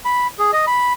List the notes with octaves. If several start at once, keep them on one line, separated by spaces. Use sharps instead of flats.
B5
G#4
D#5
B5